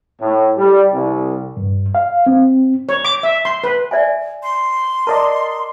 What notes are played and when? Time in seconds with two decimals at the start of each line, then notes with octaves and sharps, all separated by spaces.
0.20 A2
0.58 G3
0.92 C2
1.57 G2
1.95 F5
2.26 C4
2.89 C#5
3.05 D6
3.23 E5
3.45 C6
3.64 B4
3.91 D5 E5 G#5
4.43 C6
5.07 A#4 D5 D#5 A5